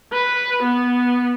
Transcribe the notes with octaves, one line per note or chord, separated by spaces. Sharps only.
B4
B3